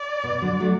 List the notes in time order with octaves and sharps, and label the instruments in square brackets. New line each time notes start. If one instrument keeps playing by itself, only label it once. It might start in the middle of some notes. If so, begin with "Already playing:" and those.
Already playing: [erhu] D5
[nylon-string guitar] B2
D3 F#3
F#3 A3